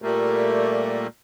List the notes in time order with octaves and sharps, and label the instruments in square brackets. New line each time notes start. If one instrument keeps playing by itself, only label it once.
[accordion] A#2 G3 A3 A#3